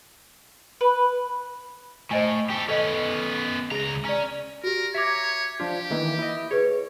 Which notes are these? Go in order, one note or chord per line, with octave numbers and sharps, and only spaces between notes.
B4
A2 C5 D#5 G#5
G4 A4 G5
B3 C#4 A4 D#5
C#2 G#4 A#5 A#6
C#4 D5 A#5
F#4 G4 A#4
C#5 E5 A#5 D6 G#6 B6
F3 D4 F4 G4
D#3 E3 A#3
E4 D#5
G#4 B4 C#5